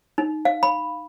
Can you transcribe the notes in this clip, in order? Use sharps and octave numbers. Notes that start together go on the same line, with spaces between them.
D#4
F5
B5